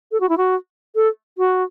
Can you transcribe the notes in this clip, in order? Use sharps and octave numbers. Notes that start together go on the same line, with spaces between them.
A4
F#4
E4
F#4
A4
F#4